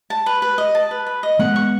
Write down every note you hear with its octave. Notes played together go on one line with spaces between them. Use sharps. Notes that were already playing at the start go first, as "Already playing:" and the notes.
A5
B4
B4
D#5
A5
B4
B4
D#5
G#3 B3 F#5
C#6